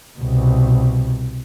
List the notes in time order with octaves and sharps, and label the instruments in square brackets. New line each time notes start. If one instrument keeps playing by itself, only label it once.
[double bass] C2 B2